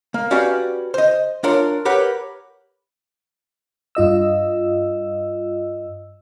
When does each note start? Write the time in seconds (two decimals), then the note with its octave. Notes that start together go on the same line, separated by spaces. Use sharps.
0.14 A#3
0.31 C#4 F#4 G4 B4 D5 F5
0.94 C5 D#5
1.44 D4 F4 A#4 C#5
1.85 G4 A#4 B4 C#5 F#5
3.95 G2 F4 D#5 E6